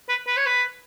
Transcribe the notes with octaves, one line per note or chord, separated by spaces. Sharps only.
B4
B4
C#5
B4